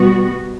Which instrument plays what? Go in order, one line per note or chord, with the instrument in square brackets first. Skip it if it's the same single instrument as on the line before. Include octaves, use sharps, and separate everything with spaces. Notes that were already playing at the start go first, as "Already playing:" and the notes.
Already playing: [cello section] B2 G3 B3 F#4